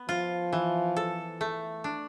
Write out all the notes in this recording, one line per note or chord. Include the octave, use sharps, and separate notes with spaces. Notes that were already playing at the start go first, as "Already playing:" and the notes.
Already playing: B3
F3 F4
E3
A4
A3
D4